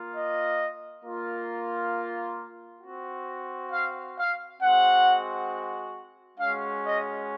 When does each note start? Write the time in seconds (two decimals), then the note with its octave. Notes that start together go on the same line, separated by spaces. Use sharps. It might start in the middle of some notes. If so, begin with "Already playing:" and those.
Already playing: A#3 F4
0.15 D#5
1.04 A#3 F4
2.82 C4 F#4
3.71 F5
4.16 F5
4.60 G#3 C4 F#4 F#5
6.38 G#3 C#4 F#4 F5
6.83 D#5